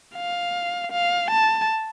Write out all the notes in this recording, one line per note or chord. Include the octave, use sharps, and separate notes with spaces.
F5
F5
A5